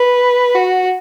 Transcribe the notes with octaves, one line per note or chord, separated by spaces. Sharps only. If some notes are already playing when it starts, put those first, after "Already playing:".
Already playing: B4
F#4